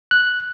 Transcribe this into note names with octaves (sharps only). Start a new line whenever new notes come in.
F#6